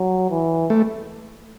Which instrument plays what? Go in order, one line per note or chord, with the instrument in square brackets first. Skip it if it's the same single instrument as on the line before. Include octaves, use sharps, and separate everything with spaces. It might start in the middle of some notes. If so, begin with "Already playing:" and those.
Already playing: [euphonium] F#3
E3
[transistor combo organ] A3